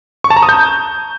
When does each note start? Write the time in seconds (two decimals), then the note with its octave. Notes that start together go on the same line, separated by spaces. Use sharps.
0.24 C#6
0.30 A5
0.37 A#5
0.43 D#6
0.49 G6